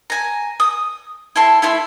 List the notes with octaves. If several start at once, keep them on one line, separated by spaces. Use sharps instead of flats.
G#5 A#5
D#6
E4 A4 C6
A3 E4 E5 C6